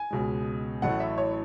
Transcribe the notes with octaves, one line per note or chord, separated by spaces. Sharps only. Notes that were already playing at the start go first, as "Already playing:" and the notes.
Already playing: G#5
C#2 B2 G#3
A1 A2 F#3 A3 F#5
E5
C#5